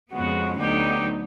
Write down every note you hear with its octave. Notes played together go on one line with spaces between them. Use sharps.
F2 C#3 F3 G#3 B3 F#4
D2 D3 F#3 B3 D#4 G4